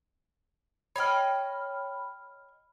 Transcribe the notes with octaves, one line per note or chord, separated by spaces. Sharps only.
C#5 D#5 G5 B5 F6